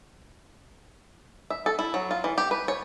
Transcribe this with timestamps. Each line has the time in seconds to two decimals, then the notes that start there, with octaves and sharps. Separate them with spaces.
1.50 E5
1.66 A4
1.79 E4
1.94 F#3
2.11 F4
2.24 E3
2.38 G4
2.51 B4
2.68 C#5